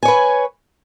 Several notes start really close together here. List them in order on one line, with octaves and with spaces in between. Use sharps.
G#5 C#5 B4